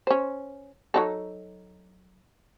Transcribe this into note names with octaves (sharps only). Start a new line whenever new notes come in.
C#4 C5
F#3 D#4 A4